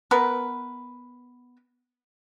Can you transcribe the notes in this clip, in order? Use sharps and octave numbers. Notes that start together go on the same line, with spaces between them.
B3 A#4 B4